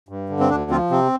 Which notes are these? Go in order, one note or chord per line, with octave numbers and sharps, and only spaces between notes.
G2
D3
C4
D2 D4
F3 C4 F4
C3 C4